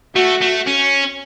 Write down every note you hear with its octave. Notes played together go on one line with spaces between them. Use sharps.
A3 F#4
A3
C#4